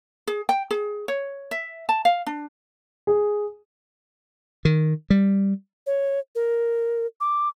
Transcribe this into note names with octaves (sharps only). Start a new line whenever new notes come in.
G#4
G5
G#4
C#5
E5
A5
F5
D4
G#4
D#3
G3
C#5
A#4
D6